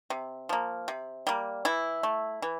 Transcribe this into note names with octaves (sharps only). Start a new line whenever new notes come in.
C3
F3 A#3
C3
G3 A#3
E3 E4
A3
E3